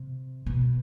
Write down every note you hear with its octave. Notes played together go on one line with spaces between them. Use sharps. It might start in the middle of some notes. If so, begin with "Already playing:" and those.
Already playing: C3
B2